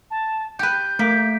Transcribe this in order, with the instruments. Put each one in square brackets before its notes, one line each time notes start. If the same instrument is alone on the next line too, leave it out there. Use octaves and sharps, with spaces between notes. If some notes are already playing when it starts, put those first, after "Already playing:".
[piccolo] A5
[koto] G4 B4 [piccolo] G6
[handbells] A3 B6 D7 [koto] A#3